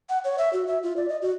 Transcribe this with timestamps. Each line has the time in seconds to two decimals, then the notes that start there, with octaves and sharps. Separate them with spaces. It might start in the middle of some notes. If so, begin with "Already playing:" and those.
0.09 F#5
0.24 C#5
0.38 E5
0.53 F#4
0.67 E5
0.83 F4
0.97 D5
1.09 D#5
1.22 F#4